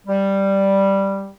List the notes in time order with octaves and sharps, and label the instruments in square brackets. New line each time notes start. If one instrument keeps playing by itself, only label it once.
[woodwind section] G3